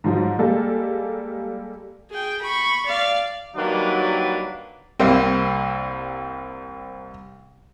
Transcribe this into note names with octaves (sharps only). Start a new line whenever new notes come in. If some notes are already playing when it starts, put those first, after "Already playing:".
G#2 F3 F#3
G3 G#3 A#3 A4
G#4 G5
B5 C#6
D5 F5
D#3 F#3 G3 A#3 D4 B4
C2 G3 A#3 C4